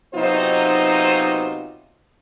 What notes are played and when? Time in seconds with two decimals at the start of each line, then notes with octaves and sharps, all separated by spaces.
0.14 C3 F#3 B3 D#4 F4 C5